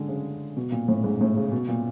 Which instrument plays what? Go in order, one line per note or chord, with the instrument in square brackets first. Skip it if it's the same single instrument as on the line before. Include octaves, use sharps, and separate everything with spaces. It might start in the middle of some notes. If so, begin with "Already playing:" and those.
Already playing: [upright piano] D3 G#3
C#3
B2
A#2
A2
G#2
A2
C#3
B2
A#2